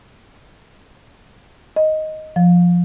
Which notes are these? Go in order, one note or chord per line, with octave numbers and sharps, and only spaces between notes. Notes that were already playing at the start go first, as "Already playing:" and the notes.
D#5
F3